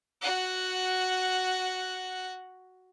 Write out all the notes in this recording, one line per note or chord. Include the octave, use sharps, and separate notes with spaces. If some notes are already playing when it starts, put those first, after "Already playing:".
F#4 F#5